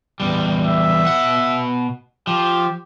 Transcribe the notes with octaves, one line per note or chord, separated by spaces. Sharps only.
E2 G3
E5
B2 F#5
F3 G4